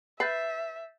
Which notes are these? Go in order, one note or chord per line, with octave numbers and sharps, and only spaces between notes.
B4 E5 G6 A6 C7